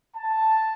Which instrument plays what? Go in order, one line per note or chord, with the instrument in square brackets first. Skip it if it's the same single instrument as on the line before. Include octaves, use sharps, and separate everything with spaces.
[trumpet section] A5